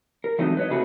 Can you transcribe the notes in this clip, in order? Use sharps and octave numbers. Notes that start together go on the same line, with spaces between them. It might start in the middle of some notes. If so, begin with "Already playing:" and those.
A#4
E3 F#3 G#3 A3 C4 D#4
B4 C#5 D#5
C3 A3 F#4 G#4 B4